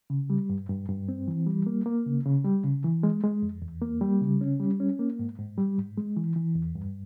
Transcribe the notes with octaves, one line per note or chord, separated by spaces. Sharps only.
C#3
G3
G2
G2
G2
C4
E3
G3
A#3
A#3
C#3
C#3
G3
C#3
E3
G#3
G#3
F2
E2
A#3
G3
C#3
C#4
G3
C#4
A#3
G#2
G#2
G3
G#2
G#3
E3
E3
E2
G2